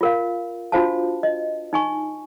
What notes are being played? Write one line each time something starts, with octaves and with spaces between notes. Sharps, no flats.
F4 A#4 F5
D4 F4 F#4 C5 F5 A5
D#5
D#4 G#5 C#6